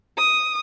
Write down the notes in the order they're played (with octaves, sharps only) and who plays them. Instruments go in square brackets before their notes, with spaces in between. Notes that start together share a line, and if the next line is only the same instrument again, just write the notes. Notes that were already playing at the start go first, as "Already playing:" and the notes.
[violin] D#6